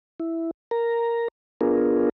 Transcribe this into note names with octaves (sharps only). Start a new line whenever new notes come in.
E4
A#4 A#5
B3 D4 F4 G#4 A#4